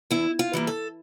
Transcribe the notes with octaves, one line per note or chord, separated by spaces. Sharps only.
E2 E4
F4
E3 G3 A#3
A4